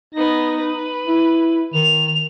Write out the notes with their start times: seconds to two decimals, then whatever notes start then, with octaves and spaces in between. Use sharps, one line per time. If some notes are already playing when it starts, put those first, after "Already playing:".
0.15 B3 D#4 A#6
0.60 B4
1.08 E4
1.74 D#3 F7